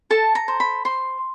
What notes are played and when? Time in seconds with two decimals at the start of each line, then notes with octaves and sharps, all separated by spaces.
0.10 A4 A5
0.35 A#5
0.48 C5
0.60 B5
0.85 C5 C6